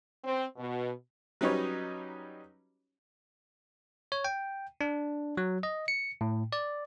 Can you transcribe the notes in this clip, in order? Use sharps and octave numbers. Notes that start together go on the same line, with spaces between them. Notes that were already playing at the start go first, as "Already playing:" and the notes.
C4
B2
F#3 G3 C#4 D#4 B4 C#5
C#5
G5
D4
F#3
D#5
C#7
A2
D5